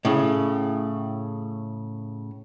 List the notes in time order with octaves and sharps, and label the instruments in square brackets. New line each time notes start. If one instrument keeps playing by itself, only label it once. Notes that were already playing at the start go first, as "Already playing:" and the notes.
[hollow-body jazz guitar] A2 C#3